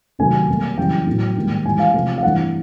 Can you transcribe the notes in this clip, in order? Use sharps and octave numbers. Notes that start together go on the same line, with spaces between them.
C3 D#3 F#3 A3 C4 G#5
B2 G3 A#3
F#2 C#3 E3 G3 G5
A2 F#3 B3
G#2 D#3 G3 A#3
G#2 E3 G3 G#5
F5
C3 F3 A3 C4
F5
G2 E3 A3 C4 F#5